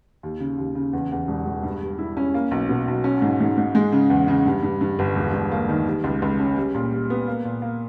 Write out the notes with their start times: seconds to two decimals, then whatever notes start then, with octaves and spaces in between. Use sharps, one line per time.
0.23 D#2
0.40 C#3
0.58 D#2
0.75 C#3
0.93 E2
1.12 E2
1.28 E1
1.46 E1
1.63 G2
1.81 G3
1.99 E4
2.17 C#4
2.34 A#3
2.51 B1
2.69 B2
2.88 B1
3.04 C#4
3.22 G#2
3.41 G#2
3.58 G#2
3.75 G#3
3.92 C#3
4.10 E2
4.28 C#3
4.46 G2
4.63 G2
4.81 G2
4.99 G1
5.16 E1
5.34 E1
5.51 A#3
5.69 D#3
5.87 G3
6.04 C#2
6.22 C#2
6.39 C#4
6.56 G3
6.75 A#2
6.92 G3
7.10 B3
7.28 A#3
7.45 A#2
7.62 A#3